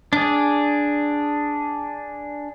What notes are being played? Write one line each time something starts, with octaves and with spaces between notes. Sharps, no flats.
D4 G#4